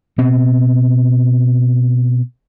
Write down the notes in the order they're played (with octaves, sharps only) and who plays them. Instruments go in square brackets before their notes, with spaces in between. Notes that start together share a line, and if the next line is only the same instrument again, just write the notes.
[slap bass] B2 C4